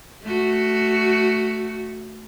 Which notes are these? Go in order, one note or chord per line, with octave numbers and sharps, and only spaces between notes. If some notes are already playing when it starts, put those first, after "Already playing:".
A3 F#4